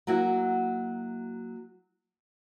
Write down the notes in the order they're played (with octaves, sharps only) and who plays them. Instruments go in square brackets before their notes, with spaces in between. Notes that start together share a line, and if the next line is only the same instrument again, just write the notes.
[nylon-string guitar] F#3 A#3 E4 F#4